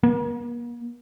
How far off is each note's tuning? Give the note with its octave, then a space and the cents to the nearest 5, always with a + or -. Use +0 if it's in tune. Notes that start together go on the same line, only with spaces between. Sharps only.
A#3 +40